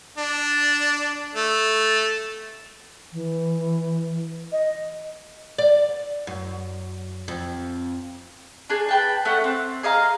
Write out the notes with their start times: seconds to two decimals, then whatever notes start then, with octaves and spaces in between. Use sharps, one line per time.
0.17 D4
1.35 A3
3.13 E3
4.52 D#5
5.58 D5
6.27 F#2
7.28 F2
8.70 D4 G#4
8.89 B4 G5 A5
9.25 A3 C#4 F#5
9.44 C4
9.83 G#4 D#5 F5 A#5